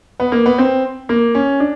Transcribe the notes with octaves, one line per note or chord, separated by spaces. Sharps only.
B3
A#3
B3
C4
A#3
C#4
D4